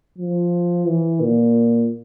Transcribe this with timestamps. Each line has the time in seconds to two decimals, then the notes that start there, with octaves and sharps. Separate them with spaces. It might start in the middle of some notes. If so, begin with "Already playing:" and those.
0.18 F3
0.87 E3
1.21 A#2